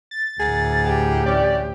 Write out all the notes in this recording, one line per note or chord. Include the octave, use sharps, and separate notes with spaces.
A6
D2 A2 G#4 A#4 F#5
G4
E3 C#4 D5